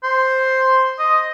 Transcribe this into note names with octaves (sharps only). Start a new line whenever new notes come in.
C5
D#5